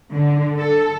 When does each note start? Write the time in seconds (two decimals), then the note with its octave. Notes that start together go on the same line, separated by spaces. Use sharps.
0.14 D3
0.59 A4